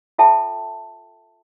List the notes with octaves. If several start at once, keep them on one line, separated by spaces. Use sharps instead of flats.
F4 A4 E5 G5 A5